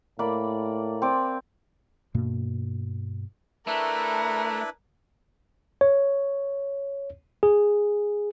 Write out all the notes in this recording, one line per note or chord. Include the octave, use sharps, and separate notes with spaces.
A2 A#3 D5 B5
C4 D5
G2 B2 A#3
A3 D4 E4 A#4 B4
C#5
G#4